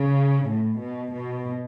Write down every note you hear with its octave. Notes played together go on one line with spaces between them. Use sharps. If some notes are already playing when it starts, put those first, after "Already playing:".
Already playing: C#3
A2
B2
B2